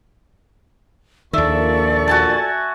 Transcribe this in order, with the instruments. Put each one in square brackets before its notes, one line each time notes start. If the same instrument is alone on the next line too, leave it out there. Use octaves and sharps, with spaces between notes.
[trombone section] A#1 A#2 [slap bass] D#2 D#3 [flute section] A4 D5 C#6 [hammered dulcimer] E5
[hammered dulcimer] F#4 G#5 A5